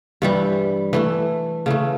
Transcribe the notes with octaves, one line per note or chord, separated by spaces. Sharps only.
G2 E3 G3
E3 A3 E4
C#3 E3 A3